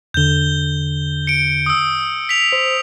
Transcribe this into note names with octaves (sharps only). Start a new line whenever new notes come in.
E2 D3 G6 G7
C#7 D7
D#6 E6
B6 F7
C5